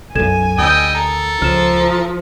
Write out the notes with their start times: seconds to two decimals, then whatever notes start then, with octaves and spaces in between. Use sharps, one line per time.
0.15 B1 F#2 A4 G#5 G#6 E7
0.58 D2 G3 D#5 G5 D#6 E6
0.95 A4 A#4
1.42 C#2 F3 F6 E7